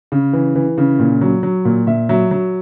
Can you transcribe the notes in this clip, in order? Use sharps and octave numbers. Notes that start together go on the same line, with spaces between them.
C#3
E3
E3
C#3
A#2
F#3
F#3
A#2
A#2 E5
F#3 E5
F#3